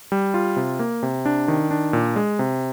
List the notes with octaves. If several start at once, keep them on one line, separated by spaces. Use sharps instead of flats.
G3
F4
C3
A#3
C3
D4
D#3
D4
A#2
G#3
C3